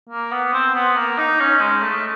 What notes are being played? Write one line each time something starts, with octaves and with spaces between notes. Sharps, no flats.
A#3
B3
C4
B3
A#3
D#4
C#4
G#3
A3